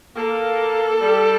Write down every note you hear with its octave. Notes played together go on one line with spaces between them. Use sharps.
A#3 A4
G3